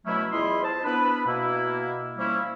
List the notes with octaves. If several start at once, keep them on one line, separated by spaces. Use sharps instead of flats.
B2 F#3 A3 C#4 E4
E2 E4 F4 D#5 B5 C6
C5 A5
B3 D4 E4 B4
B2 A#3 E4
F3 G3 A#3 C#4 E4